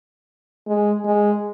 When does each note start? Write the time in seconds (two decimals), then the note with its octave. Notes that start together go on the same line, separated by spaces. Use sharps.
0.67 G#3
1.05 G#3